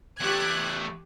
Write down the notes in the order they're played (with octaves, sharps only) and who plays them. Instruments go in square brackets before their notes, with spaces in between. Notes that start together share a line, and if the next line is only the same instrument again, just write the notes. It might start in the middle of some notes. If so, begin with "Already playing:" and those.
[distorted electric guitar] E2 A3 [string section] G4 F#6 G#6